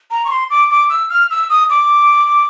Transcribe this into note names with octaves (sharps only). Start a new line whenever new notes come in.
A#5
C#6
C6
D6
D6
E6
F6
E6
D#6
D6